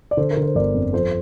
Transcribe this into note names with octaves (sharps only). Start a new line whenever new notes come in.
D5
D3 A4 C5
A#4
D3
C5
G1 A#4 D5
F2
F3 A4 C5